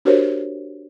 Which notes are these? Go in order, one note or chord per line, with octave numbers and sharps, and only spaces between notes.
D4 F#4 G4 A#4 C5 C#5